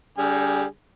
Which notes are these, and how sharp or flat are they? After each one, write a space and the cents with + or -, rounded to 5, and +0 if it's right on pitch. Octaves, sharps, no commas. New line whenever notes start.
D3 -35 G3 +0 G#4 +0